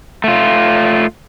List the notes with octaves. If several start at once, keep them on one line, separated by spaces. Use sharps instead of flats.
A3 F4